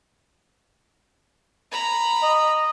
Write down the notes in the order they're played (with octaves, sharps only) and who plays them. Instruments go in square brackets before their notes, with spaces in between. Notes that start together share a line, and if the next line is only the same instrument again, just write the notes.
[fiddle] A#5 B5
[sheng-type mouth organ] D#5